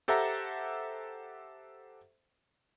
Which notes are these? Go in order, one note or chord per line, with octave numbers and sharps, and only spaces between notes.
G4 A4 C5 E5 F#5 A#5